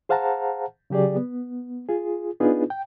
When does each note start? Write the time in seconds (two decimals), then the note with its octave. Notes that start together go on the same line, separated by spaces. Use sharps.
0.09 G#4 C5 F5 F#5 A5 A#5
0.90 C#3 F#3 G4 G#4 D5
1.16 B3
1.89 F4 G#4
2.40 B3 D4 D#4 F4 G#4 B4
2.70 G5